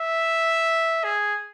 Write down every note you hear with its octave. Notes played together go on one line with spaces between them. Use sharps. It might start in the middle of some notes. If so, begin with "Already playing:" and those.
Already playing: E5
G#4